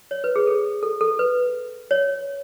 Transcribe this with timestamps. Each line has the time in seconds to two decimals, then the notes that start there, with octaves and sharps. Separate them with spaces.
0.11 C#5
0.24 B4
0.36 G#4
0.47 A4
0.83 A4
1.01 A4
1.19 B4
1.91 C#5